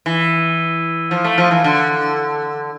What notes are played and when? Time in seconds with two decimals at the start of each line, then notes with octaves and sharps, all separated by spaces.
0.06 E3
1.11 F3
1.24 A3
1.38 F3
1.51 E3
1.64 D3